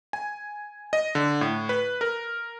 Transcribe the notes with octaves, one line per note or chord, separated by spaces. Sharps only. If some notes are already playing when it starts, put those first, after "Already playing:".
G#5
D#5
D3
A2
B4
A#4